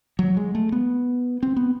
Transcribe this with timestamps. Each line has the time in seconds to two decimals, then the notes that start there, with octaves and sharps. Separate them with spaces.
0.19 F#3
0.37 G#3
0.55 A3
0.72 B3
1.43 C4
1.56 B3